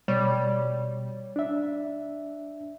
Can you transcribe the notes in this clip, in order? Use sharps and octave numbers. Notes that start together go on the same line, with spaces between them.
B2 G3 C#5
D4 E5